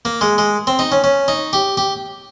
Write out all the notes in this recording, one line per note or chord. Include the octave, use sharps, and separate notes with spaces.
A#3
G#3
G#3
C4
D#4
C#4
C#4
D#4
G4
G4